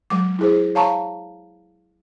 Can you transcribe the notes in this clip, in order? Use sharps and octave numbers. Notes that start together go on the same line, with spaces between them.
F#3 G#3 D6
E4 G#4 C5
C#5 F5 A5 A#5 C#6